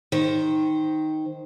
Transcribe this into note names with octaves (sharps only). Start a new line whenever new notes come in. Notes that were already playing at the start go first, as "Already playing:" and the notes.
D#3 C5